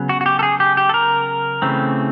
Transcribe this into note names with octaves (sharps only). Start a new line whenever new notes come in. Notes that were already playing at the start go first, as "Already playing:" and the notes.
Already playing: C#3 F#3 B3
F#4
F#4
G4
A4
G#4
G4
G4
A4
A#4
C#3 E3 A3 C4